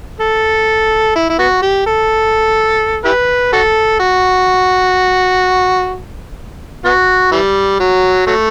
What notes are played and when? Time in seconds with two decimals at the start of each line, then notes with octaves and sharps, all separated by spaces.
0.20 A4
1.15 E4
1.29 E4
1.39 B3 F#4
1.62 G4
1.86 A4
3.05 E4 G4 B4
3.53 F#4 A4
4.00 F#4
6.85 B3 F#4
7.32 E3 G3
7.80 F#3
8.27 F#3 A3